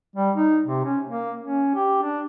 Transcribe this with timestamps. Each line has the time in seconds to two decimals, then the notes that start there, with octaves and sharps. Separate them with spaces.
0.16 G3
0.35 D#4
0.66 C3
0.85 C#4
1.06 A#3
1.41 C#4
1.75 G4
2.02 D4